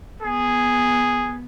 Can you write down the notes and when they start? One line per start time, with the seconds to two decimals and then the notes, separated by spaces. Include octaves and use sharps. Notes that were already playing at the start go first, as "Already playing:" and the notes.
0.23 B3 G#4